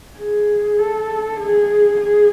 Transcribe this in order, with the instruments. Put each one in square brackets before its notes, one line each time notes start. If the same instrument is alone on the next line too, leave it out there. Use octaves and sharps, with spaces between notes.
[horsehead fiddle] G#4
A4
G#4
G#4